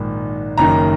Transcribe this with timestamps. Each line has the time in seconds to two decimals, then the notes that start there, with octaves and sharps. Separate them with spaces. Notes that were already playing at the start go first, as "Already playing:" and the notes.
Already playing: A#1 G#2 D#3
0.58 F#1 F#2 D#3 A#5